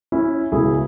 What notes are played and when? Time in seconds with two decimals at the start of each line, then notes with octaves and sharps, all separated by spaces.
0.12 C#4 E4
0.52 C#2 B2 E4 G#4